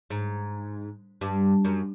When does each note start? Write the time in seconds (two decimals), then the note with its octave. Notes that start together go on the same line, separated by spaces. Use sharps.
0.10 G#2
1.21 G2
1.65 F#2